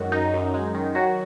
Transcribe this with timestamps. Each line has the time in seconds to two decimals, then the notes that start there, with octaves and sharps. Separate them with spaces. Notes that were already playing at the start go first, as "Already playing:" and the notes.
Already playing: F#2 D#3 G#3 F#4
0.12 F#2 D#4
0.34 F#2
0.54 G#3
0.75 D#3
0.95 F#3 F#4